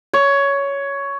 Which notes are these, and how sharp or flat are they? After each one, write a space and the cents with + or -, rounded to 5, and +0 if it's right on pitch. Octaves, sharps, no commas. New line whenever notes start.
C#5 +10